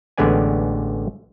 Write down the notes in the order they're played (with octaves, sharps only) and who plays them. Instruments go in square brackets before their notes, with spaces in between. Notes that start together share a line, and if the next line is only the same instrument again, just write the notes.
[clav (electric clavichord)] A1 D3 G#3 B3 D5 G#5